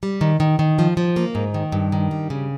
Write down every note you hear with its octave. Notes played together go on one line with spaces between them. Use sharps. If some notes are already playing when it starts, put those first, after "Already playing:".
G3
D#3
D#3
D#3
F3
F3
A#3
G#2
D#3
G2
D#3
G3
C#3